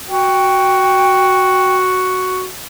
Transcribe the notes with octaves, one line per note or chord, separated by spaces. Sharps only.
F#4 G5